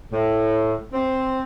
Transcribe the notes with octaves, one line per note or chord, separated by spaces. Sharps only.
A2
C4